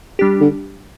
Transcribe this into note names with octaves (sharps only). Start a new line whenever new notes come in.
G3 D4 G4
D3